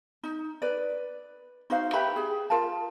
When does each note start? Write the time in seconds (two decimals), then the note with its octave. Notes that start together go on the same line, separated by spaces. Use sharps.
0.23 D#4
0.62 B4 D5
1.70 D#4 F#4 C5 F5
1.93 G4 B4 E5 B5
2.16 G#4
2.50 F4 A#4 F5 A5